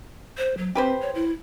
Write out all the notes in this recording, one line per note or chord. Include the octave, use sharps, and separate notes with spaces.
C5
F#3
C4 G4 B4 C5
C#5
E4